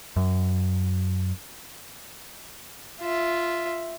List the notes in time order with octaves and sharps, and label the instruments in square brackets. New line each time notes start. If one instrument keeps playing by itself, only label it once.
[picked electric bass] F#2
[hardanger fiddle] F4 E5